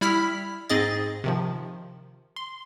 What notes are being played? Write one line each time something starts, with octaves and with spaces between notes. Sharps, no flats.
G3 E4 B5 F6 B6
G#2 C4 G#4 D#5 A6
C3 D#3 F3
C6